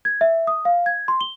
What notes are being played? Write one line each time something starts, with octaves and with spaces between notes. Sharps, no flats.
G#6
E5
D#6
F5
G#6
C6
G7